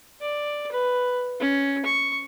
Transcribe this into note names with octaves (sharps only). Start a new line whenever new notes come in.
D5
B4
C#4
C#6